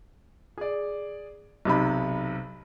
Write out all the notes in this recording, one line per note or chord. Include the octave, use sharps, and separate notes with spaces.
G#4 D5
B1 C3 D#4 B5